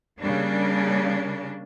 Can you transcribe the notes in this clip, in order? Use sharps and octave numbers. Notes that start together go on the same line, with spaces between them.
C#3 G3 A#3 D4